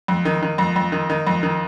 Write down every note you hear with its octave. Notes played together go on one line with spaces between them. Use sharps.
F2
D#3
D#3
F2
F2
D#3
D#3
F2
D#3